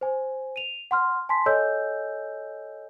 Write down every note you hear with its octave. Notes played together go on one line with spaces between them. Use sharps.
C5 G#5
D#7 F7
F#5 C6 F6
G#5 A5 C6 B6
A4 C#5 D#5 G#5 E6 G6